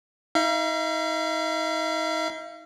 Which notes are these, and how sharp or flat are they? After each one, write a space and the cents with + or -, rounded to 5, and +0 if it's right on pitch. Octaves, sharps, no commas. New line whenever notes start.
D#4 +35 F5 -40